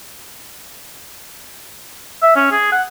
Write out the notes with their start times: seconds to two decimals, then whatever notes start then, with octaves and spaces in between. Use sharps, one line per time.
2.22 E5
2.36 C#4
2.52 G#4
2.72 F#5